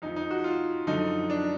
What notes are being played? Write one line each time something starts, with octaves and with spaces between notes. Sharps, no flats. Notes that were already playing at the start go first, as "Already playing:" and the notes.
F2 F3 D#4
D#4
F#4
F4
F#2 D3 F3 D#4
D4